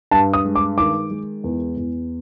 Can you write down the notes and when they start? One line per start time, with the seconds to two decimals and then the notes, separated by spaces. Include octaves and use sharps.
0.11 G2 A5
0.34 D#6
0.45 G#3
0.55 D6
0.78 D#3 D6
1.10 G#3
1.44 E2
1.77 E2